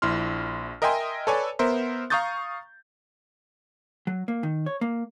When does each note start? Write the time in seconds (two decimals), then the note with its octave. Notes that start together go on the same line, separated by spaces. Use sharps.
0.02 A#1 E4 C6 F6
0.82 A#4 D#5 E5 G5 G#5 C6
1.27 A4 B4 C#5 D5 G#5
1.59 B3 A#4 C5 E5
2.10 F5 A#5 C#6 D#6 G6 A6
4.07 F#3
4.28 A#3
4.43 D#3
4.66 C#5
4.81 A#3